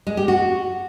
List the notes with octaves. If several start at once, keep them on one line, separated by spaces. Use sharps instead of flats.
G#3
G4
F#4